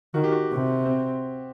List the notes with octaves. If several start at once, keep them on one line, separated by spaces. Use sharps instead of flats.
D#3 F#4
G4
F#4
C3 F#4
C4